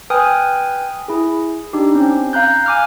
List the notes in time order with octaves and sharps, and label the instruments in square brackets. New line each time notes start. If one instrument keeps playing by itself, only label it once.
[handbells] B4 G5 G#5 D#6 F6
E4 G#4
D4 D#4 G4
C4 C#4
F5 A#5 F#6 G6
G#5 D6 F6